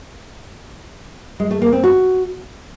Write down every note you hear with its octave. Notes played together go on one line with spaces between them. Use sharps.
G#3
A3
A#3
C4
F#4